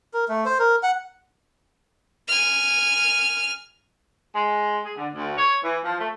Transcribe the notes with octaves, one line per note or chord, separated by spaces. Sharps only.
A#4
A3
C5
A#4
F#5
G#5 F6
G#3
G#4
D3
D2
C#5
E3
F3
A3